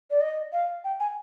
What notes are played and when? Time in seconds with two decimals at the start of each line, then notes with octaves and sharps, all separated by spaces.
0.11 D5
0.21 D#5
0.53 F5
0.84 G5
1.00 G#5